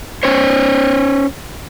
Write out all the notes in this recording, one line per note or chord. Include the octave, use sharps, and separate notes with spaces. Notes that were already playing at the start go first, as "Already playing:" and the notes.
C#4 C5 C#5